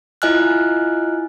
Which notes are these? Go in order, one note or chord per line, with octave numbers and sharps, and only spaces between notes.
E4 F4 D#5 G#5 F6 F#6